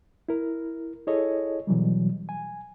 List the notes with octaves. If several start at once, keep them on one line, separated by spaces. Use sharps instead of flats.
E4 A#4
E4 G#4 A4 C#5 D#5
B2 E3 F#3 G3
G#5